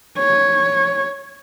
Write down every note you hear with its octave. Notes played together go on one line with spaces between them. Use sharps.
C#5